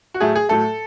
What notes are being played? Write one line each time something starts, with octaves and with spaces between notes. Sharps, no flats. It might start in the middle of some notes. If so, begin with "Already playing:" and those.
F#4
A2 F#3 A3 G#4
G#4
A2 F#3 A3 A4